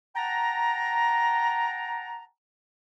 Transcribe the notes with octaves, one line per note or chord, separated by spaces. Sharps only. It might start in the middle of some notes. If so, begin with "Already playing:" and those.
F#5 G5 A5 A#5